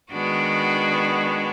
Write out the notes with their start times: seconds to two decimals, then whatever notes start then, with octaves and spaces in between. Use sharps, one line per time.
0.11 D#3 G#3 B3 D4 F#4